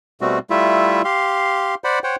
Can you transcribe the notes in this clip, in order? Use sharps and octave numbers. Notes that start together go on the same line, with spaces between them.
B2 G3 A3 C4 F#4
G3 A3 E4 F4 E5
G4 F5 C6
C5 D5 F#5 B5
C5 C#5 F#5 G5